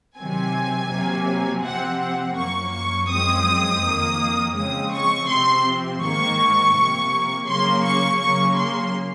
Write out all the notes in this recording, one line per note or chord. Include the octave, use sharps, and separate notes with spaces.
C3 D#3 F#3 C4 G#5
C3 F#3 A#3
C3 F3 C4 F#5
F#5
F#2 F3 A#3 C#6
C#6
F#2 F3 G#3 C4 D#6
F2 D#3 A#3
C#3 F3 G#3 C4 D#6
C#6
C3 F3 C4 C6
G#2 D#3 A#3 C#6
C3 F3 A#3
C#3 F#3 A#3 C6
C#6
C#3 F#3 A#3 C#6
C6